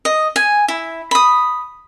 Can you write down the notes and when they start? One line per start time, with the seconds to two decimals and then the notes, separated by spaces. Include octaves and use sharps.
0.05 D#5
0.36 G#5
0.68 E4
1.11 B5 D#6